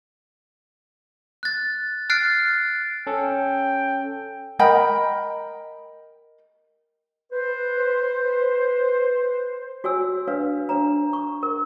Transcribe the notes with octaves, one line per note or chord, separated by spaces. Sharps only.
F#6 A6
F6 F#6 A6 C7 D7
C#4 A4 G5
A#4 D#5 G5 B5
B4 C5
F#4 C#5 G#5 E6
D4 B4 C#5 F5
D4 C#5 A#5
C#6
A#4